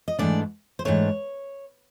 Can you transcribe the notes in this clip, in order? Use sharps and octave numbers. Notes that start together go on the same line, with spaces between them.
D#5
G#2 E3 A3 D4 D5
C5
G#2 E3 A3 D4 C#5